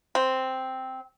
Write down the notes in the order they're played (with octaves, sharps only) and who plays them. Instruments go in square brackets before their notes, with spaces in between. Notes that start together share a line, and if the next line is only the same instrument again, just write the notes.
[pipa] C4